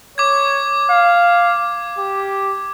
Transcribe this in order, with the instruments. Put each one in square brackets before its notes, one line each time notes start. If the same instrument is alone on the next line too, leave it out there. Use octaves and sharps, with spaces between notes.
[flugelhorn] C#5 [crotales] D6 G#6
[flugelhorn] F5
G4